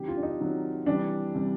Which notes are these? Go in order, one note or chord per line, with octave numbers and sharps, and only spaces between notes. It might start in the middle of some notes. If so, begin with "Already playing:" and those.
Already playing: C3 D#3 F#3 G4
F4
D4
D#4
C3 D#3 F#3
C3 E3 G3 D4
C3 E3 G3